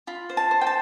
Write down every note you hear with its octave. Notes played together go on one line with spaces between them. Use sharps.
F4 B5
C5
A5
C5
G5
A5